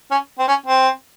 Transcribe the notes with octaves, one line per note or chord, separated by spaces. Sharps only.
C#4
C4
C#4
C4